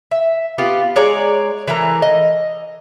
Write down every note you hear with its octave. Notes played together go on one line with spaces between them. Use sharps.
E5
B3 F4 G4
G#3 C#5 D5 A#5
E3 A3 A#3 A#5
D#5